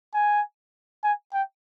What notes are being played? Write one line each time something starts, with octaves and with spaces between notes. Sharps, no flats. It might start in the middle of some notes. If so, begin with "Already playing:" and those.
G#5
G#5
G5